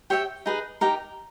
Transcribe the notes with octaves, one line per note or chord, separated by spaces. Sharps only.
G4 C#5 E5 G5
D#4 G#4 B4
D#4 G4 A#4